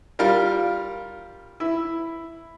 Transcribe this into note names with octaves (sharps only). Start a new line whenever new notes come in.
G3 F4 A#4 F6
E4